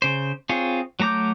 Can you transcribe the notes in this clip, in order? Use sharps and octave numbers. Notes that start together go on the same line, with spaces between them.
C#3 C5
C4 F4 G#4 C#5
F#3 A3 A#5 D6 G6